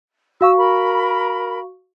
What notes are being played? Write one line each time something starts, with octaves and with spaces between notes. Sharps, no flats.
F#4 F5 C#6 E6
A#4 B5